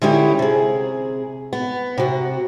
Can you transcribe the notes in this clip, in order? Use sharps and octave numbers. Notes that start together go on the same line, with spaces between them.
D3 G#3 C#4 D#4 E4 G4
C3 G#4
B3
C3 F#4